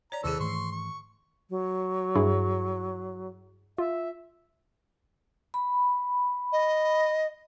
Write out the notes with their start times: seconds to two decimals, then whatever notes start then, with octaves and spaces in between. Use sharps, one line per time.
0.12 C#5 D5 A#5
0.24 D#2 C3 D#3 E3 G#4 A4 E6
0.40 G#2 E3 A3 C6 C#6
0.72 C#6
1.50 F#3
2.15 G2 E4 G#4
3.78 F4 E5
5.54 B5
6.52 D#5